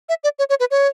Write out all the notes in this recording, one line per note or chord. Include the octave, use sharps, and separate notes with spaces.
E5
D5
C#5
C#5
B4
C#5